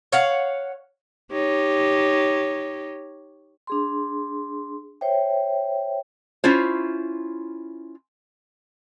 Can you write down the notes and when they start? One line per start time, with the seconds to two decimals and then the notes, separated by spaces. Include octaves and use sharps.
0.12 C#5 F5 F#5
1.32 D#4 G4 C#5
3.67 D4 G#4 C6
5.01 C5 C#5 E5 G5
6.44 C#4 E4 F4 C5